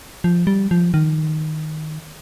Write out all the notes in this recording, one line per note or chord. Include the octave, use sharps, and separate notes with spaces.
F3
G3
F3
D#3